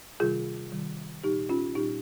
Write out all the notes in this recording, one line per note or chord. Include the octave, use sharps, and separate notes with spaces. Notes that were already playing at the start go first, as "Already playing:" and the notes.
C3 D#3 G3 F4 G#4
C3 D#3 G3
A#2 G3 D#4 G4
C#4 F4
A#2 G3 D#4 G4